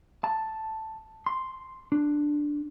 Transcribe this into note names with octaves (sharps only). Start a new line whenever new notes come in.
A5
C6
D4